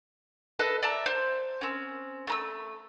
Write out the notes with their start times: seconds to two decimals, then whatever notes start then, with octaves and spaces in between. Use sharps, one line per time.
0.59 A4 B4 D#5
0.83 D5 E5 A5 A#5
1.06 C5
1.61 C4 C#4
2.27 A3 A#5 E6